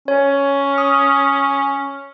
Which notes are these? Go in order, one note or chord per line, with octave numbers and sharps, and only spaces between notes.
C#4 C#5
D#6